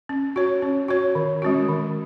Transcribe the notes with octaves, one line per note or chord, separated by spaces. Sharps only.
C#4
F#4 C#5
C#4
F#4 C#5
D#3
G#3 C#4 F#4
D#3